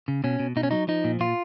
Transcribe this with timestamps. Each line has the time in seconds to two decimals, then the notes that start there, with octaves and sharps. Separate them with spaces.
0.08 C#3
0.24 B2 C#4
0.40 B2
0.56 B2 D#4
0.63 C#4
0.71 F#3 D#4
0.88 F3 D#4
1.04 A#2
1.20 A#2 F4